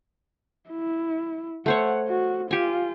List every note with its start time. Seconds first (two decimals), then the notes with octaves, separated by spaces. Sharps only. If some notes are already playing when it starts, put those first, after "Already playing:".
0.70 E4
1.66 A3 C5 C#5 F#5
2.09 F#4
2.51 F4 G4 G#5